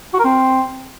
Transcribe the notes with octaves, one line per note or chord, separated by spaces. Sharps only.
F#4
A#4
C4